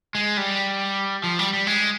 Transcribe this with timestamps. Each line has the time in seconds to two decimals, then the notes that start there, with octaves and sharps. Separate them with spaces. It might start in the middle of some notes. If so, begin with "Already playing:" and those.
0.15 G#3
0.37 G3
1.24 F3
1.39 G3
1.53 G3
1.67 G#3